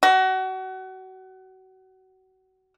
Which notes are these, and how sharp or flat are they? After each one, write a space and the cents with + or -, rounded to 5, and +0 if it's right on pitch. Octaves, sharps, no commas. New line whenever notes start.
F#4 +30